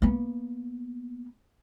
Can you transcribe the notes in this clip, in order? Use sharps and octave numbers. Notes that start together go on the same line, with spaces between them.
A#3 B3